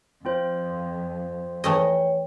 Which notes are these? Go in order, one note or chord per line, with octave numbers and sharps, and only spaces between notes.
F2 C4 F4 C5
E3 A3 C#5 D#5 G5